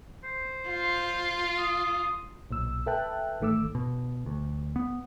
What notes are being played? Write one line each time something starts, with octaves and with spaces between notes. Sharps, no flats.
C5
F4
D#6
B1 A#2 E6
A4 B4 E5 G5 A5 F#6
A1 D#3 A3 D6 E6
B2
D2
B3